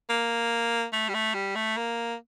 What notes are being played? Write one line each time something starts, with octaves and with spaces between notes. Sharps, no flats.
A#3
A3
G3
A3
G3
A3
A#3